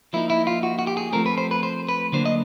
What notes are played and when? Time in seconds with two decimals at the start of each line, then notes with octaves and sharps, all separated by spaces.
0.13 F3 A#3 D#4 E4
0.30 E4
0.47 F4
0.63 F#4
0.79 F#4
0.87 G4
0.97 G#4
1.13 F3 A3 C4 A#4
1.26 B4
1.38 C5
1.51 B4
1.63 C5
1.89 B4
2.12 D3 F#3 A#3 D4 C5
2.26 D#5